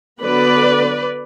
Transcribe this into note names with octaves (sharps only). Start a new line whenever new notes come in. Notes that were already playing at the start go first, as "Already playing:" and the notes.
D3 F#3 B3 B4 D5